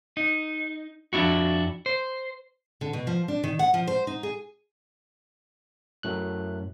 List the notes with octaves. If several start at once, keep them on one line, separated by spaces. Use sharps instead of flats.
D#4
F2 D4 E4 F#4
C5
D3
B2
F3
D4
D#3
F#5
F3
C5
D#4
G#4
F#2 A2 F#6